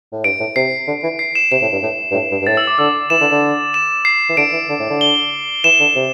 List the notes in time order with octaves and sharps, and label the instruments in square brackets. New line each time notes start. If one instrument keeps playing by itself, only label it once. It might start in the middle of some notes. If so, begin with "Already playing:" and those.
[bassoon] A2
[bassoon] G2 [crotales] D7
[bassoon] A2
[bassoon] C3 [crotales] C7
[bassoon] D3
E3
[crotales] C7
E7
[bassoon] C3 [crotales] E7
[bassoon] A2
G2
A2
G2
A2
G2
G2
[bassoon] A2 [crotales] A6
[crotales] E6
D6
[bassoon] D3 [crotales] E6
[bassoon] E3 [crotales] E7
[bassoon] D3
D3
[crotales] E7
C7
[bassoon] E3
[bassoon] D3 [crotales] D7
[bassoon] E3
D3
A2
D3
[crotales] G7
[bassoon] E3 [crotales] E7
[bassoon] D3
C3